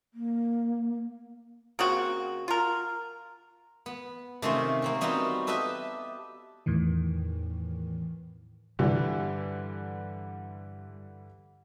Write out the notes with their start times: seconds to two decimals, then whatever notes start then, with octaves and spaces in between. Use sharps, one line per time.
0.14 A#3
1.79 C#3 A#3 C4 F#4
2.48 F4 A#4
3.86 B3
4.42 C3 D#3 A3 C#4 F4 C5
4.82 A#3 C4 C#4
5.01 G3 B3 C4 D#4 F4 F#4
5.47 G4 A4 B4 D#5 E5
6.66 E2 A2 D#3 E3
8.79 G2 D3 E3 G3